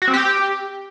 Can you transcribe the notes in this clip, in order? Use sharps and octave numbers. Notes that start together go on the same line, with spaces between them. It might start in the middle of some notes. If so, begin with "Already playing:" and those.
F#4
C4
G4